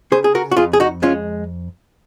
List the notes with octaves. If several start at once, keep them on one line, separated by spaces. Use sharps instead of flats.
C#3 G#4 C5
G#4
F#4 A#4
F#4
F2 F4 G#4
G#4
D#4 F#4
G#3 C#4 F4